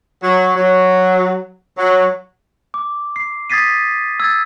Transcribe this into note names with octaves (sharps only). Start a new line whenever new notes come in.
F#3
F#3
F#3
D6
C7
D#6 G#6 A6 B6 C7 D#7
E6 G#6 A6